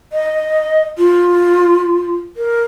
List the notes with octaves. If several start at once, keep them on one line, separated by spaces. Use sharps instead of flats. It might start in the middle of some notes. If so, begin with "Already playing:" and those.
D#5
F4
A#4